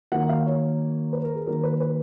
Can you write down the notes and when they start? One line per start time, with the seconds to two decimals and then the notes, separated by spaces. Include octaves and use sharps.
0.12 D#3 F#3 A#3 F#5
0.29 F5
0.46 C#5
1.13 B4
1.24 A#4
1.35 G#4
1.46 D#3 F#3 A#3 A#4
1.63 B4
1.80 B4